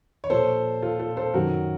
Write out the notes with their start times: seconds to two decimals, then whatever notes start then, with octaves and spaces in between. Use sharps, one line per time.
0.24 C#5
0.30 A#2 F3 A4 C5
0.82 F4 A4
0.99 F4 A4
1.17 A4 C5
1.34 F#2 D#3 F#3 F#4 A#4